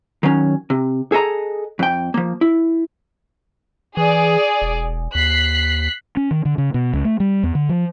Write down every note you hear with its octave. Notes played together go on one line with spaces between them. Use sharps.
D#3 F#3 C#4
C3
G#4 A4 D#5 A#5
F2 G5
F3 A#3
E4
E3 G#4 D5
E1
D#2 F#6 B6 C7
C#4
D#3
D3
C#3
B2
C#2
A3
G3
E2
D3
F3